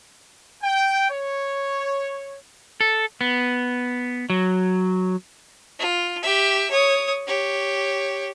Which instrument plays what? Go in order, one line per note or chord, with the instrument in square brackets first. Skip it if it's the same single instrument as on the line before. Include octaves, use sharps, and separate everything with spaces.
[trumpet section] G5
C#5
[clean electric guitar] A4
B3
F#3
[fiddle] F4
G4 E5
C#5 D#6
G4 C#5